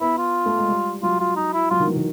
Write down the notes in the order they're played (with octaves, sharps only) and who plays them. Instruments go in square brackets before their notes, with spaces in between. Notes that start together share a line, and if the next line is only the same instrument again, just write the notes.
[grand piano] B3 [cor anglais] E4
[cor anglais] F4
[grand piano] A3
G#3
G3
[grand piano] F#3 [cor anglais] F4
[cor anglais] F4
D#4
E4
[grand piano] F#3 [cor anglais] F4
[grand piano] D#3
E3
D#3